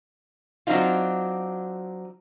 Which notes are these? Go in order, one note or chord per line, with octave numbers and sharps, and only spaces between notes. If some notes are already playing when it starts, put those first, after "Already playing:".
F#3 C4 D4 D#4 F4